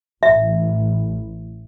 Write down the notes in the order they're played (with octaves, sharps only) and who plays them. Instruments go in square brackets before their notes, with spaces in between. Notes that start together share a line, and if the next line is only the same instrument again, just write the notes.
[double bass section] A1 [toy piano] E5